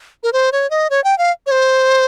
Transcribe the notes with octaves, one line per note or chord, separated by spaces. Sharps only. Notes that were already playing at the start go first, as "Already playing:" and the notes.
A#4
C5
C#5
D#5
C#5
G5
F5
C#5
C5